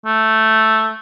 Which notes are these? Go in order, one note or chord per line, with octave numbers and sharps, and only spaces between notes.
A3